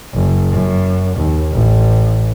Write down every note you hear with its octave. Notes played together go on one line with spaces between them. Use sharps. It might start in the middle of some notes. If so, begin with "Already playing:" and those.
F#1
F#2
D#2
A1